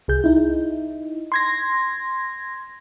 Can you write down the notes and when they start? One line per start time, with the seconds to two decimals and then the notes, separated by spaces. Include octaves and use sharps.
0.08 C2 G#4 G6
0.24 D#4 E4
1.32 C6 G#6 A#6